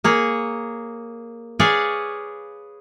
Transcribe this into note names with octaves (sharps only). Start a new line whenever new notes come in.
A#3 G#4 C#5
G#4 B4 C#5 D5 F5 G#5